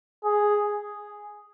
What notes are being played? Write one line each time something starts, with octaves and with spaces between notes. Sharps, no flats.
G#4